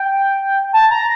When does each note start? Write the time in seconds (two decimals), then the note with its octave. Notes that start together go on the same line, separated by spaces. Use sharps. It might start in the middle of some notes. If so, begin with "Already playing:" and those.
Already playing: G5
0.73 A5
0.91 A#5